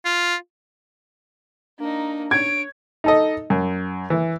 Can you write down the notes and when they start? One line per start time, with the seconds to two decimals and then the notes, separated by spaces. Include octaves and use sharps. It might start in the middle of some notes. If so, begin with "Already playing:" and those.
0.05 F4
1.79 A#3 D4 D#4
2.31 C#5 G#6 D7
3.04 D#4 A4 D#5
3.50 F#2
4.10 E3